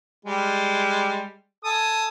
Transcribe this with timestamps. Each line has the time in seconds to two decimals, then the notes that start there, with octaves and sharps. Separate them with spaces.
0.25 G3 G#3
1.65 A4 G#5 D#6